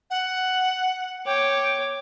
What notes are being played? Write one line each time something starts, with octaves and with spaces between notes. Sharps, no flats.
F#5
C#5 G5 D6